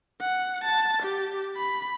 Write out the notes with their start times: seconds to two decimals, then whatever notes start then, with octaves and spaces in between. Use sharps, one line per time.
0.21 F#5
0.64 A5
1.02 G4
1.57 B5